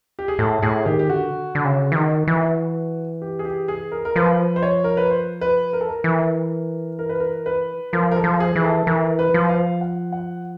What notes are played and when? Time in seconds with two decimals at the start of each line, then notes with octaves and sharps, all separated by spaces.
0.19 G4
0.28 G#4
0.39 A2 A4
0.62 A2 G#4
0.86 D#3 G4
0.99 G4
1.09 D3 F#4
1.55 D3
1.65 C#3
1.92 E3
1.96 D#3
2.27 E3
3.22 G4
3.39 G#4
3.45 G4
3.68 G#4
3.92 A#4
4.05 A#4
4.16 F3 B4
4.56 C5
4.63 C#5
4.84 A#4
4.97 B4
5.10 C5
5.41 B4
5.73 A#4
5.81 A4
5.89 A#4
6.04 E3
6.99 A#4
7.09 B4
7.20 A#4
7.46 B4
7.93 F3 A#4
8.12 A#4
8.16 A4
8.24 F3
8.40 G#4
8.56 E3
8.64 A4
8.87 E3 A#4
9.19 B4
9.34 F3
9.49 F5
9.81 F#5
10.13 F#5